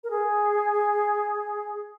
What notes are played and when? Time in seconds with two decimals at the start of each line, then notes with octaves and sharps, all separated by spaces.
0.04 A#4
0.10 G#4